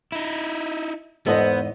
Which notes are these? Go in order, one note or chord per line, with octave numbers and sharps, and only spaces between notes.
D#4 E4
E2 G#2 B3 A4 C5 D#5